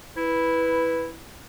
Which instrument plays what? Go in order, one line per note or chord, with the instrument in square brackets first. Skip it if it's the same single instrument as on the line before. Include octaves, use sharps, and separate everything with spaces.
[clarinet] E4 [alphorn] B4